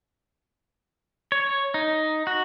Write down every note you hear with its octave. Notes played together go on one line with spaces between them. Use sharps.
C#5
D#4
F#4